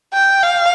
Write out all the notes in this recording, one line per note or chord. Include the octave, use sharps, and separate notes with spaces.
G5
F5